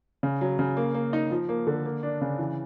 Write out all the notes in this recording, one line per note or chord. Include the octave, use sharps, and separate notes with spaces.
C#3
F#3
C#3
A#3
A#3
D#4
F3
A#3
D3
A#3
D4
C#3
E3